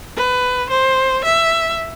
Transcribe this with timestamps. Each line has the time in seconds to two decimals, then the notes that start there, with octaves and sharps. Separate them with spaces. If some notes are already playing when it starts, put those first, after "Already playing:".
0.16 B4
0.70 C5
1.24 E5